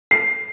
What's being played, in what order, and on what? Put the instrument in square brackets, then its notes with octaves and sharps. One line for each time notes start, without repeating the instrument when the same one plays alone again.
[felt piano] C7